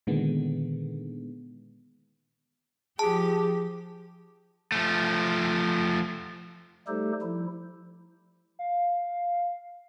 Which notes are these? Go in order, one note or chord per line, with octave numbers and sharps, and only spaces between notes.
A#2 D3 D#3 G#3 B3
F3 G4 G#4 A5
F3 A3
G3 A3 D#4 G4 A4 C5
F3 E4
F5